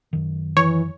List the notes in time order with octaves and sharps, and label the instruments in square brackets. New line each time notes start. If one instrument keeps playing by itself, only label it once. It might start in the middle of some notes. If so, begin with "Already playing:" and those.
[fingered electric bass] F#2 D#3
[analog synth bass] E3 [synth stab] C#5